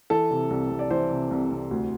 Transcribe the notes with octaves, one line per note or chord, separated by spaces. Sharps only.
E3 A4
C3
C2
C2
D5
E3 C5
C3
C2
C2
D2